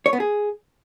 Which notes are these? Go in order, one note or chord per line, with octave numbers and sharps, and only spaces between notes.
C#5
B3
G#4